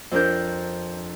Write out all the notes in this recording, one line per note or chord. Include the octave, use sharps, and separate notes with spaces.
F2 D4 A#4 G6